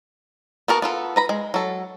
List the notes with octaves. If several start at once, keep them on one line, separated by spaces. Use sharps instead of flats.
B3 F#4 A#4 A5
B3 F4 A4
B4 A#5 B5
G#3
F#3 A4